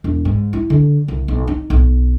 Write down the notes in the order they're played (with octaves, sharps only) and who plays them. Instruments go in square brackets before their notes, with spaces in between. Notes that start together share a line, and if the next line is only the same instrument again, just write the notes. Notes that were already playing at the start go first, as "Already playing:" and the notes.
[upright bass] E1
G#2
E4
D3
C2
B1
D#4
B1